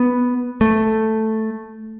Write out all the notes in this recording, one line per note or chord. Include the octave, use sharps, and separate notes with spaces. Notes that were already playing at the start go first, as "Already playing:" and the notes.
Already playing: B3
A3